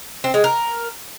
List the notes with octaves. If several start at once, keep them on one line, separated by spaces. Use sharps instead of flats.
C4
G#3
A#4